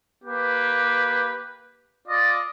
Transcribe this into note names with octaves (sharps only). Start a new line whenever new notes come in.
A#3 G4 B4
F4 D5 D#5